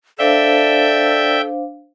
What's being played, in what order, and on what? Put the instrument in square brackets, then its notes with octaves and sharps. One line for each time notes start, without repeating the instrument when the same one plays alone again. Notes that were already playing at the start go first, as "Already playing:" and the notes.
[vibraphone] D4 C5 F5 [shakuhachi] A4 [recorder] D5 [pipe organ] E5 G5